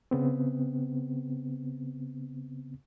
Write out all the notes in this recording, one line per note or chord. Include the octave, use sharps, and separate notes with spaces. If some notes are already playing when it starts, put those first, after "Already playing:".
C#3 B3 C4